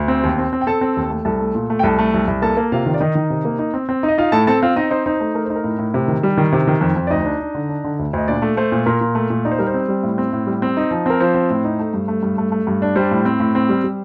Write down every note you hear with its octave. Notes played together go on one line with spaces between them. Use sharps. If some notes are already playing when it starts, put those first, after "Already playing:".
Already playing: D2
C4
D#2
C4
C4
G5
C4 A4 A5
C4
D#2
A3
C2 A4 A5
A3
A#2
A3
G5
C2 A4 A5
A3
C2
C2
A#3 A4 A5
A#3
C3 F4 F5
D#3
D5
D#3 D#4 D#5
D#3
C3
A#3
D#4
C4
C4
D#4
D#5
D#4 F4 F5
A2 A4 A5
C4 A4 A5
C4 F4 F5
C4 D#4 D#5
D#4 C5
D#4 C5
A3 C5
A3 A#4
C5
D#4
A#4
A2
A2
C3
D#3
G3
D#3
C3
D#3
F2
F2
D5
D2 D#4 D#5
D4
D4
D3
D4
D3
D2
D2 D#5
A#2 D4 D5
A3
A3 C5
A#2
A#2 A#4
A#2
A3
A#2
D#4 D5
C5
G3 A#4
C5
C4
G3
A2
C4
A2
G3
C4
D#4
F3
C4 A#4
F3 C5
C4
A2
D#4
A3
G2
A3
G2
A3
A3
G2
D4
G3 C5
A2
C4
A2
C4
G3
G3